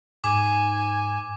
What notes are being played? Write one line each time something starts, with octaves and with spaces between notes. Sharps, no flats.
G#2 G#5 D6